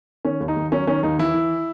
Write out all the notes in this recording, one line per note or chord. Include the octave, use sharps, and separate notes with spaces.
D#3 C#4
D#2
D#4
D#2
F#3 C#4
D#3 C#4
D#2 D#4
E3 E4
E3